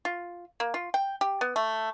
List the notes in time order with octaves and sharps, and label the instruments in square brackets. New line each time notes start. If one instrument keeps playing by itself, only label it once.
[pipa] F4
A#3
F4
G5
G4
B3
A3